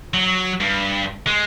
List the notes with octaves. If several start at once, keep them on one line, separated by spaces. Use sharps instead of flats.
F#3
G2
G#3